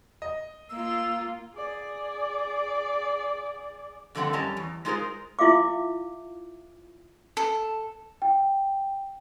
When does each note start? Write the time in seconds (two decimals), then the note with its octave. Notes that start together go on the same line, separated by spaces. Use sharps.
0.22 D#5
0.70 A#3 F4 E6
1.55 G#4 D5
4.15 G2 D3 F3 A3 C4 F#5
4.33 F#2 G3 C#4 D#5 A5 A#5
4.57 E2
4.85 G#3 D#4 F4 G#4 A#4 C5
5.39 E4 F4 E5 F5 D6
7.37 A4
8.22 G5